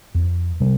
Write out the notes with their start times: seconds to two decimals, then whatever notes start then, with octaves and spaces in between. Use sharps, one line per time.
0.15 F2
0.60 C3 G3 C4